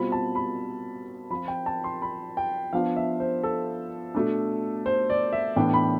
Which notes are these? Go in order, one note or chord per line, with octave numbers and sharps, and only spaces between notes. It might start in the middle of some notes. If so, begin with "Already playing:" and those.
Already playing: B2 G3 C4 F4 B5
A5
B5
F3 C4 F4 B5
G5
A5
C6
B5
G5
F3 B3 D4 F4 F5
E5
C5
A4
B2 A3 D4
C5
D5
E5
A2 E3 B3 D4 G5
B5